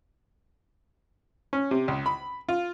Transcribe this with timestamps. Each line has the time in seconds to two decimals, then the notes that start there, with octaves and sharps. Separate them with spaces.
1.53 C#4
1.71 C3
1.88 C#2
2.06 B5
2.49 F4